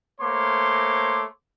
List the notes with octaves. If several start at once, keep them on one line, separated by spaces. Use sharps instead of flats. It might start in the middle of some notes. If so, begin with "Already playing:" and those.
A3 A#3 C5 C#5 C6 D6